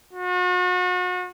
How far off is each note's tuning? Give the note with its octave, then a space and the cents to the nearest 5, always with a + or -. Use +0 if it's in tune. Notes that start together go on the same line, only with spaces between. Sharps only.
F#4 -40